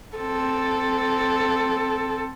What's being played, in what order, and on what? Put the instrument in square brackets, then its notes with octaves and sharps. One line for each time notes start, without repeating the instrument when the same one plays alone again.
[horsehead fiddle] C4 A4